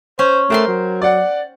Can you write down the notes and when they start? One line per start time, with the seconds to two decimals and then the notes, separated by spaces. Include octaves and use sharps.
0.19 C#4 C5
0.50 A3 A#4 C5 G5 C6
0.68 F#3
1.02 D5 F#5